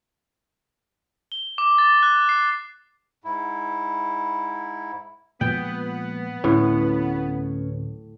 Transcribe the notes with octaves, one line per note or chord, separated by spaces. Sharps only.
G7
D6
A6
F#6
C7
G#2 E4
A#2 F3 G#3 B3 G5
D1 A2 C#4 B4 C#5